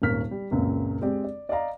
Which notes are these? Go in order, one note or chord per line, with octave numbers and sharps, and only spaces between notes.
D#1 G#1 A#3 C#4 F6 B6
G3
C#2 F#2 A#2 C#3 C4
G#3 C4 G4 D5
D5
D5 D#5 F5 A#5